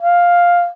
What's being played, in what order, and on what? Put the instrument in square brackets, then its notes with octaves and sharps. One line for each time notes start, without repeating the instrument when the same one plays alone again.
[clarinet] F5